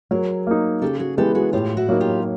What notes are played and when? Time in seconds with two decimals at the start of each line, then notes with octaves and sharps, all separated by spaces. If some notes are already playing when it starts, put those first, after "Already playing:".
0.11 F#3 G#4 A#4
0.47 A#3 D#4
0.82 C#3 G4 A4
0.99 F#4 G#4
1.17 E3 G#3 B3 G4 A4
1.35 F#4 G#4
1.53 A2 F4 G4
1.77 E4 F#4
1.89 F#3 A#3 D#4
2.01 F4 G4